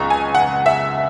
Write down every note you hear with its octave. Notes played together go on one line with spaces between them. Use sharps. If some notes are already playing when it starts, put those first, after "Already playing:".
Already playing: C#2 G#3 A#5 C#6
G#5
F#5
E5